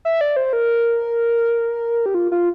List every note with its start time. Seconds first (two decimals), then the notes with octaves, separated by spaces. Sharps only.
0.05 E5
0.21 D5
0.36 C5
0.53 A#4
2.06 G4
2.14 F4
2.32 F4